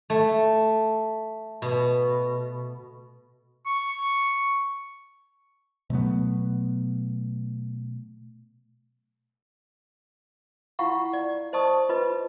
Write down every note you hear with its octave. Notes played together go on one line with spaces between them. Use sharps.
A3
B2
C#6
B2 F#3 A3 B3
E4 F4 F5 F#5 C#6
D5
C5 D#5 A5 C#6 D#6
F4 B4 D#5